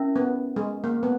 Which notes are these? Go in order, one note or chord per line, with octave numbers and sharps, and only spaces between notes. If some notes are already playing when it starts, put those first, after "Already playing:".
Already playing: C#4 E4 A#4 E5
B3
G#3
A#3
B3